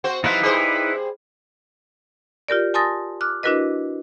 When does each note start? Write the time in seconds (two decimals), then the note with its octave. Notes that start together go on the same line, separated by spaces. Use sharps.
0.04 C4 F#4 C5
0.24 F3 G3 C4 D#4 E4 B4
0.41 G3 G#4 C5
2.48 F4 G4 A#4 D5
2.74 G#5 A5 C6 D#6 A6 A#6
3.21 D6 F6 F#6
3.43 D4 E4 F#4 A#4 B4 D#5